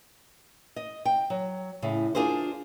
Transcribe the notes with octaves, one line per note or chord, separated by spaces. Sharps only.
D#5
G5
F#3
A2 C#3
D4 F4 G#4 A#4 C5